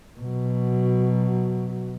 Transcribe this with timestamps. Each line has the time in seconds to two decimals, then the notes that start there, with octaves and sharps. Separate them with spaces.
0.20 B2 F#3